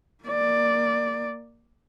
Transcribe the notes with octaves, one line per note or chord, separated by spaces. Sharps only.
A#3 D5